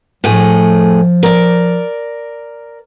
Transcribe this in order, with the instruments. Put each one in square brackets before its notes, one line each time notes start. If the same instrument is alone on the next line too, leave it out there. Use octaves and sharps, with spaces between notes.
[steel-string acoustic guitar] A2 A3 G#4 [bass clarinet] F3
[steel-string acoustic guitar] A#4 D5